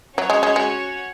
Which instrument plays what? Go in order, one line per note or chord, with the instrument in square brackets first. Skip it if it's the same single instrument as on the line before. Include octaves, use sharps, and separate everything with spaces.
[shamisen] F#3 [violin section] C#4 F#4 C#5
[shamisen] G#3
G#3
G#3